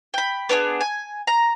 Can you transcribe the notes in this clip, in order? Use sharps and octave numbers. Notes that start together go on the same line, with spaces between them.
G5 B5
B3 D4 D#4 G#4
G#5
A#5